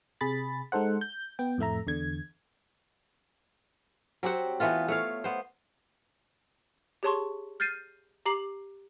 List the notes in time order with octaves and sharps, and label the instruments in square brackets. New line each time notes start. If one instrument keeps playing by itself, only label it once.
[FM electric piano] C3 G#4 B5 A6
G#3 D#4 A4 C5 F#5
G6
B3 G5
F2 A2 A3 E5 A#5
E2 D3 G#6
[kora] F#3 C4 G4 F#5
E3 A3 B3 F4
A3 C#5 F5
B3 C5
[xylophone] G4 G#4 C#5 A5 C6 C#6
F6 G6 A6 C7 D#7
G4 A#5 D6 C7 F#7